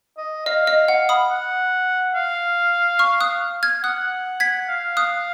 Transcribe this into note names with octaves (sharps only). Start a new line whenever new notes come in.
D#5
D#5 F5
D#5
F#5
B5 D#6
F#5
F5
C#6 F6
D#6 F#6
F6 G#6
F#5 D#6 F#6
G#6 B6
F5
D#6 F#6